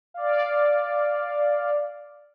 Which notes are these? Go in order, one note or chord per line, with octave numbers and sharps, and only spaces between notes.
D5 F5